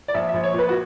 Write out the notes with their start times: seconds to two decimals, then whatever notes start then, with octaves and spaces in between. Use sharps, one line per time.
0.08 D5
0.14 A#1 E5
0.29 E5
0.34 A#1
0.43 C#5
0.54 A#2 B4
0.69 F#4